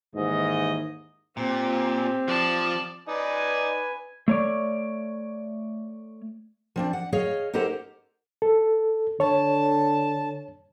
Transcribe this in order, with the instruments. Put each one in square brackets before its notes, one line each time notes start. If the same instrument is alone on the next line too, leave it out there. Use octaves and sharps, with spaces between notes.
[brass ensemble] D#2 G#2 E3 D#5
[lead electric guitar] A#2 [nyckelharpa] C4 G4
[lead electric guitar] F3 [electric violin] D5 A5
[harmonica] D#4 D5 [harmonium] B4 [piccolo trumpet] G#5
[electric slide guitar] A3 C#5 D5
[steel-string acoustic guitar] F3 C4 D4
F#5
G#4 C#5 D#5 F5
D#4 G4 A4 A#4 C5 F#5
[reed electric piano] A4
[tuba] D3 [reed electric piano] C#5 [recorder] A5